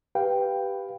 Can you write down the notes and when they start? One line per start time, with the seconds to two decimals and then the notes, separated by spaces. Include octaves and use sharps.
0.15 G4 B4 F5 G5